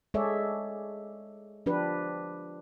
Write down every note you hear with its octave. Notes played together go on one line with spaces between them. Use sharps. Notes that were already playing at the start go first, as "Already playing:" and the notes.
G#3 G#4 A4 C#5 D5 E5
F3 D4 G4 B4